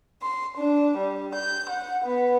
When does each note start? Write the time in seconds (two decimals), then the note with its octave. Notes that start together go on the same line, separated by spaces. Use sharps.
0.21 C6
0.56 D4
0.96 G3
1.34 G6
1.68 F#5
2.03 B3